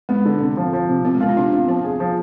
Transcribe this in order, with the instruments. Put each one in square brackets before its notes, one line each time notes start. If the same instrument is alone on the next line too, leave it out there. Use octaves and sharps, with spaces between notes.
[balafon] G#3 [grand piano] B3
[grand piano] D3
C3
F3
F3
C3
[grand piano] C3 [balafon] B3
[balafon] G#3
[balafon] B3 [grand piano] F4
[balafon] C4
[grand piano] C3 [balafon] D4
[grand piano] F4
[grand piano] F3 [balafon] B3
[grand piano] G#4
F3